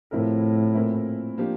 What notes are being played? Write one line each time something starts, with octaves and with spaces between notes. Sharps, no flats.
A2 C3 F3 C4 E4 A#4
A#2 A3 C4 E4 A#4
F3 A#3 D4 G4